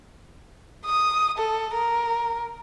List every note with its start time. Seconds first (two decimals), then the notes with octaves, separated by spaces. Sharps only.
0.86 D#6
1.38 A4
1.74 A#4